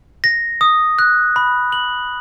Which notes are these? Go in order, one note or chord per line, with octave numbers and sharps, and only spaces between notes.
A#6
D#6
F#6
B5
F#7